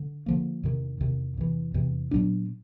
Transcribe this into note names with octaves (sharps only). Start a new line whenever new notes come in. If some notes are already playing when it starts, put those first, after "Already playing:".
Already playing: D3
D3 F3 A#3
E2 C3 D#3
E2 C3 D#3
E2 C3 E3
E2 C3 E3
A#2 F#3 B3 D4